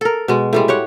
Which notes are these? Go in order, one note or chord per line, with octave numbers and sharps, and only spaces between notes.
A4 A#4
B2 G#3
A2 G3 G#3
G4 C#5 F#5